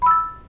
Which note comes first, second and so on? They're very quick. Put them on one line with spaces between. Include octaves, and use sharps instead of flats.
B5 E6 A6